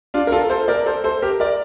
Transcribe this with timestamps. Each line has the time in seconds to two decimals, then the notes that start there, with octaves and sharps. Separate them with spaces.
0.14 D4 F4
0.27 A#4
0.32 F4 A4
0.50 A4 C5
0.68 A#4 D5
0.86 A4 C5
1.04 A4 C5
1.22 G4 A#4
1.40 A#4 D5